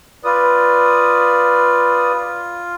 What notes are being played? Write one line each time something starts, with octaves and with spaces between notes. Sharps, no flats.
F4 B4 D5 D#6